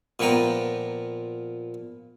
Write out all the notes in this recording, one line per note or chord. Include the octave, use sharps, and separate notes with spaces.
A#2 F3 B3 G5 A#5